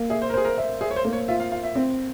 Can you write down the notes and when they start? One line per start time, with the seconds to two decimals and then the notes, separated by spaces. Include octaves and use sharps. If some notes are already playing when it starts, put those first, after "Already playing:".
Already playing: A#3
0.10 G#4 E5
0.22 C5
0.30 A#4
0.34 G#4 C5
0.45 A#4
0.58 E5
0.81 G#4 E5
0.91 C#5
0.96 C5
1.05 A#3
1.13 C#5
1.28 F4 E5
1.40 F5
1.52 F4 F5
1.63 E5
1.75 C4